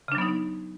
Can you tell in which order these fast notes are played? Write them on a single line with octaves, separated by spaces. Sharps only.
C#3 D4 F#3 B3 D#4